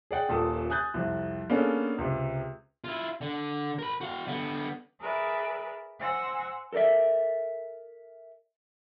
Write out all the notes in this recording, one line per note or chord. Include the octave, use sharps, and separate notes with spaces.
G#4 D5 F#5 G5
D#1 A#2 A4 A5 D#6
G#5 D#6 F#6 G6 A6
C2 F2
A#3 B3 C#4 D4 G#4 A4
C#2 C3
E4 F4
D3
A#4 B5
F#4 F5
D3 B3
G#4 A#4 B4 D5 E5
C5 F#5 G#5 C6 E6 A#6
A4 A#4 C5 D5 E5